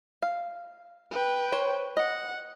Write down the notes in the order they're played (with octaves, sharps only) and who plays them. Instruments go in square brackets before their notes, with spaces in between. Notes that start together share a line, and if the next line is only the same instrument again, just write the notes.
[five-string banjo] F5
[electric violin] B4 G5
[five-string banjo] C5 C#5
[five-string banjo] D#5 [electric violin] F#5